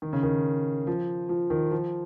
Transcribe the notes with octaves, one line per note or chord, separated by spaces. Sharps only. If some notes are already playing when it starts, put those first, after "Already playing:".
D#3
C#3
D#3
F3
F3
D#3
F3